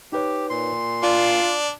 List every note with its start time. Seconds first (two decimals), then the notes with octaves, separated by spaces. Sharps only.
0.12 D#4 G4 B4 C#5
0.50 A#2 C6
1.03 D4 F4 D5